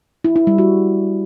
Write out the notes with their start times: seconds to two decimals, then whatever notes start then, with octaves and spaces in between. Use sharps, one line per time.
0.24 E4
0.36 E4
0.47 G3
0.58 F#4